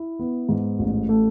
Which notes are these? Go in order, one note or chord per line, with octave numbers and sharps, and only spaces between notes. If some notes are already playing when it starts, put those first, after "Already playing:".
Already playing: E4
B3
G#2
A1
A3